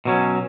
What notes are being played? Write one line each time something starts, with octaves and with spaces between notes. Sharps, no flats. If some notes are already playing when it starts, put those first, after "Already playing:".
B2 F#3 C#4